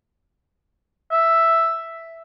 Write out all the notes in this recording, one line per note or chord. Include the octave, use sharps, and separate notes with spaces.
E5